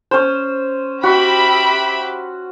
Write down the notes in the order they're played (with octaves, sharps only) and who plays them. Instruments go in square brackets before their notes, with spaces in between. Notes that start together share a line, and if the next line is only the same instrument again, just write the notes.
[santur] C#4 C5
[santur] F#4 [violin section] G4 E5 B5